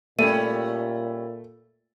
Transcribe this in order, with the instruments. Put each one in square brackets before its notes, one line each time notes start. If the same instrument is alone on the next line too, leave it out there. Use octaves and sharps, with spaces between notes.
[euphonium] A#2 [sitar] G3 C#4 [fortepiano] A3 [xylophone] D#7